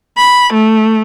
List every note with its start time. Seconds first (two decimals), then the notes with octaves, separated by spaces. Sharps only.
0.18 B5
0.54 A3